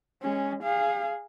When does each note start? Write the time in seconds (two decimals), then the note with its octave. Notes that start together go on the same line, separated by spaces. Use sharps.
0.22 G#3 C#4
0.64 G#4 F5